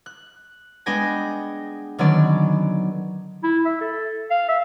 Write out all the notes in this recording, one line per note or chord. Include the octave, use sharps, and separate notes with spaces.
F#6
G#3 B3 D4 G5 G#5 A#6
D3 D#3 F#3 B3 C#4 D5
E4
E5
A4
F5
E5